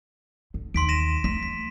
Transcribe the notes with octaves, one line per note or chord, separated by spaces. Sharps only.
D3
D#2 C6 B6 D7
A#6 D#7 E7
A3 B6
B6